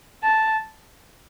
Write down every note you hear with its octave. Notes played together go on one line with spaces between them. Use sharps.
A5